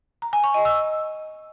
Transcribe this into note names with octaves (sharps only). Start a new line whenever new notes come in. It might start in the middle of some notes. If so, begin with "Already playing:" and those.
A#5
G#5
C#6
D#5
E6